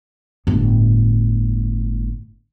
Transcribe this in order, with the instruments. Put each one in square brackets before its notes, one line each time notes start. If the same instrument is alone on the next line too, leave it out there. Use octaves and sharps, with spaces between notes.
[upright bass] G1 A2